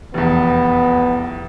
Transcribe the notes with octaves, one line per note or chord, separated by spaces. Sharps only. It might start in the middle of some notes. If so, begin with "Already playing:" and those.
F1 E2 B3